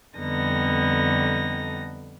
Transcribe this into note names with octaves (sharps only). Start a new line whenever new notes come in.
F2 D3 G3 B3 D#4 A#6